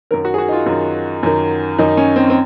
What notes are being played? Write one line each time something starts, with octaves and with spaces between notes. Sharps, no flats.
F#2 D#3 A#4
F#4
G#4
F#4
D#4
F4
F#2 D#3
F#2 D#3
F#2 D#3 D#4
C#4
C4
C4